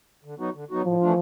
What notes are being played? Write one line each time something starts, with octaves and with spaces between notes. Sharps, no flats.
D3
F#3 B3 D#4 F#4
D3
F#3 B3 D#4 F#4
A2 F3
E3 A3 D4 F4